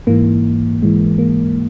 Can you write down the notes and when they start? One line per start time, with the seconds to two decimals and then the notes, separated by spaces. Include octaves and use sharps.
0.07 G#2 E3 A#3
0.82 G#2 E3 G#3
1.18 A#3